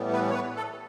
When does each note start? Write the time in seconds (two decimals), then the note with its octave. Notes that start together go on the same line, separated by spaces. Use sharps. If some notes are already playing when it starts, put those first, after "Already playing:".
Already playing: A2 E3 G3 B3
0.13 B4
0.30 C#5
0.34 B4
0.56 A4